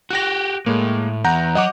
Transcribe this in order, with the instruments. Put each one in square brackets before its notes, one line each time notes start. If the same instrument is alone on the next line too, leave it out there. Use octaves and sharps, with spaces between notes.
[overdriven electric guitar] F#4 G4 [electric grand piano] F#6 A#6
[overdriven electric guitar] A2 [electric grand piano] G#3 A#3
[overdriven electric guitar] E2 [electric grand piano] F#5 A#5 G6
[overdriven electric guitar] F#3 [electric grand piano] D#5 F#5 D6